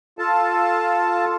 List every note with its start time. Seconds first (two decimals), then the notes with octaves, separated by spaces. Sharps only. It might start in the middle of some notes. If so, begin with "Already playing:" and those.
0.19 F4 A4 A5